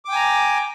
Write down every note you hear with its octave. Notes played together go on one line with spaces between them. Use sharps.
G5 G#5 A#5 D6